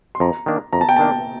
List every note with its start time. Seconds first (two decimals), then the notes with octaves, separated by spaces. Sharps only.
0.15 C6
0.20 F2 A#5
0.46 D#3 A#3 D4
0.73 F2 A#5
0.81 A5
0.89 G5
0.96 D#3 A#3 D4 A5